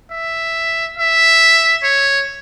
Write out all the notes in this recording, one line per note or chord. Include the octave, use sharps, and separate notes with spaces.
E5
E5
C#5